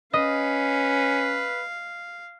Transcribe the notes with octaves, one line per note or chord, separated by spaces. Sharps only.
C#4 B4 D#5 F5